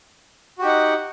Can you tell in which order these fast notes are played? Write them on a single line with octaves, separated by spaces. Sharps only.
F#4 G4 D#4 F#5